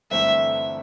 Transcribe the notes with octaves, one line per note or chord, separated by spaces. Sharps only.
G1 G2 E3 A3 C4 E5